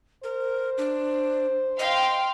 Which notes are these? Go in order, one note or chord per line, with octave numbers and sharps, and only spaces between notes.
A#4 C5
D4
D#5 F5 G5 C6